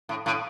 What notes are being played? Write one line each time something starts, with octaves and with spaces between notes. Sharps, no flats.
A2
A2